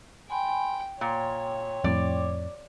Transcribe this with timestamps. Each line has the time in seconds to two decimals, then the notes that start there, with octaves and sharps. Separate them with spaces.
0.30 G5 G#5 B5 C6
1.01 A#2 C#5 G5 C6
1.84 F2 A2 D5